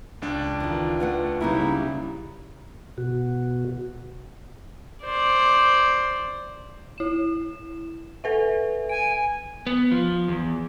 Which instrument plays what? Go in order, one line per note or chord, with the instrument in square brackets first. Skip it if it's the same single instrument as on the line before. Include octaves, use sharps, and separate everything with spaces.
[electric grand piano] C#2 D4 D5
[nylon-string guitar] D#3 E3 [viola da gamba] F4
[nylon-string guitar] A3 B4 F#5
[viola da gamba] C#3 G3 [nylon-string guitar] F#3 A#3 D#4 [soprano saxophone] E4
[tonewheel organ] B2 F#4
[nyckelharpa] C5 D5
[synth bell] E4 E7
A4 B4 E5
[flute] G#5 [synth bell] D7
[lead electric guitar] B3
F3
E2